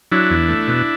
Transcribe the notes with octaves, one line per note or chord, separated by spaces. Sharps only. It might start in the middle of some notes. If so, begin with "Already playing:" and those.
F#3 D4 E4
E2
A3
B2